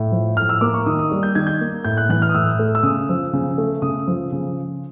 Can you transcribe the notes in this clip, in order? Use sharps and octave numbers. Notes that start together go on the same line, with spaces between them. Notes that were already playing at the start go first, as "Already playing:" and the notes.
Already playing: A2
F3
A2 F6
E6
A#3 D6
C#6
D#3 D#6
D#6
G3
G6
D#3 G#6
G6
A#3
A2 G6
F#6
E3 F#6
F6
D#6
A2 E6
A3
E6
C#3 D#6
F3
C#3
A3
C#3 D#6
F3
C#3